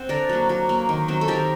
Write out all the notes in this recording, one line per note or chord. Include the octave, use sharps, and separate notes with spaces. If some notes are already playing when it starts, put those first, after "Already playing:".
Already playing: C4 C5 F#5
D3 A#4 D5
F#3 A#3
F#3
A#3
D#3
F#3 C4
A4
D#3 G4 A#4